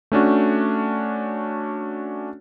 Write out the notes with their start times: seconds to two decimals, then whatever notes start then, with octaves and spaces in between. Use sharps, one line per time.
0.12 A3 C#4 D4 F#4